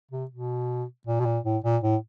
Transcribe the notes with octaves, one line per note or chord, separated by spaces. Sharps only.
C3
B2
A#2
B2
A#2
A2
A#2
A2